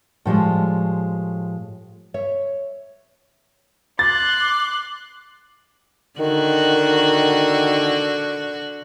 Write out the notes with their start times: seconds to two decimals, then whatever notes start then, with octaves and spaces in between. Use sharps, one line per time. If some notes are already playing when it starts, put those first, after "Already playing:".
0.25 A2 F3 G3 G#3
2.14 C#5 E5
3.99 C6 D6 F#6 A6
6.20 D3 D#3 F#4